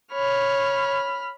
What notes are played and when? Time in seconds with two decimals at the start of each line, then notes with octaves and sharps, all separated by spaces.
0.13 C#5 B5 F6